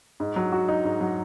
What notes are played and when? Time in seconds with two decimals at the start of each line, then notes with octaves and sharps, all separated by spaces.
0.20 G#2
0.36 F#3
0.52 F#4
0.68 D#4
0.84 G#2
1.01 F#3